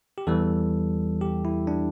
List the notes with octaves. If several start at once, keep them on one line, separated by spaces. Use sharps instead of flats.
G4
E2 E3 G3 A4
G4
E4
D4